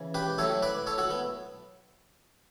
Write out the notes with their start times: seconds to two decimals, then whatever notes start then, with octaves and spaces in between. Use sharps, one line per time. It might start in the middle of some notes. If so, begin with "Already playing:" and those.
Already playing: C#3 E3
0.15 G4 B4
0.38 A2 F#3 A4 C#5
0.63 B4 D5
0.87 A4 C#5
0.98 F#4 A4
1.11 B3